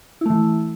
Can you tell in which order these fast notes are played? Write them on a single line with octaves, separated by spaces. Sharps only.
E4 A3 E3